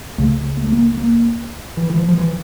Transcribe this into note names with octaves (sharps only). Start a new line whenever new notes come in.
C#2 C#3 A3
A#3
A3
A#3
A#3
E3
E3
F3
F3
E3